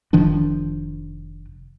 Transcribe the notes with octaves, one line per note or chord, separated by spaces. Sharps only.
F1 D#3 F3 D4